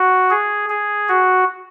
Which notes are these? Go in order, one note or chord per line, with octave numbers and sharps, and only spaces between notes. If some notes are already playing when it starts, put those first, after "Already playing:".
Already playing: F#4
G#4
G#4
F#4